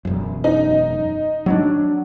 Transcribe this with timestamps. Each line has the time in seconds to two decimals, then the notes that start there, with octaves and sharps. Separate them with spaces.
0.05 E1 F#2
0.44 D#4
1.46 F#3 C4 D4